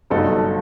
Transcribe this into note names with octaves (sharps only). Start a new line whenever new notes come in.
G1 G2 F#3 A3 D#4 A4
A4